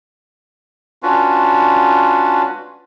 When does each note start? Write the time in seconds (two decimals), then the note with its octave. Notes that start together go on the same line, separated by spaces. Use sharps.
1.03 C#4 D4 F4 F#4 B4